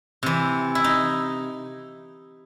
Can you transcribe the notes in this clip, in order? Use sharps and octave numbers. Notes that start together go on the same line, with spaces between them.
C3 E3
E4
D#4